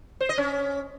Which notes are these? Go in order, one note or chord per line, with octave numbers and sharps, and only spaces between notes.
C5
D#5
C#4